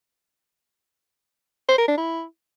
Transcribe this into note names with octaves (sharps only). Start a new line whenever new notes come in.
C5
A#4
D4
E4